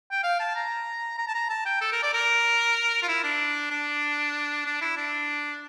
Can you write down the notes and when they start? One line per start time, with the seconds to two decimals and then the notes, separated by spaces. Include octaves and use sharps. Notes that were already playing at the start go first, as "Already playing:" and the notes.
0.12 G5
0.23 F5
0.40 A5
0.55 A#5
1.18 A#5
1.28 A5
1.34 A#5
1.50 A5
1.66 G5
1.81 A4
1.92 A#4
2.03 D5
2.14 A#4
3.02 F4
3.08 E4
3.24 D4
3.71 D4
4.66 D4
4.81 E4
4.97 D4